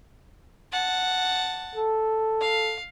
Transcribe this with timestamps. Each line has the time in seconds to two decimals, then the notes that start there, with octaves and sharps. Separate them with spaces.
0.72 F#5 A5
1.75 A4
2.40 F5